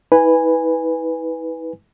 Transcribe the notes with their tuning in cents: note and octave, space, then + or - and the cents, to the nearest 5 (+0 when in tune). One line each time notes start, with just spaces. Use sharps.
E4 -40 B4 +0 G#5 -10